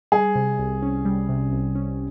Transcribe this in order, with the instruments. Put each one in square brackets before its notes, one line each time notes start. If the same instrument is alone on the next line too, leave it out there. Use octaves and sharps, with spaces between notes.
[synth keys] G3 [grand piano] G#4
[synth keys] C3
C2
C#4
G3
C3
C2
C#4